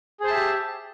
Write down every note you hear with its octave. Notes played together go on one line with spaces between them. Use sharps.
G4 G#4 C5 E5 A5